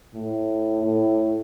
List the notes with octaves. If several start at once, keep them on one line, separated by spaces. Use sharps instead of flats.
A2
A2